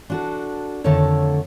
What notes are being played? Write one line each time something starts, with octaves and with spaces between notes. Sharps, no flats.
D4 F#4 A4
F2 D3 D#3 A3 A4 C#5